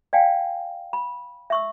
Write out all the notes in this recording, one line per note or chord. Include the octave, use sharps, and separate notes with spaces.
D5 F5 G5 G#5
B5
E5 C#6 E6